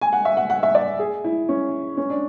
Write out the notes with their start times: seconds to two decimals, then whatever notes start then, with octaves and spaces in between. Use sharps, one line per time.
0.01 G#5
0.13 F#5
0.25 E5
0.37 F#5
0.50 F#5
0.63 E5
0.75 D5
0.99 G#4
1.24 E4
1.49 C#4
1.97 C#4
2.10 D4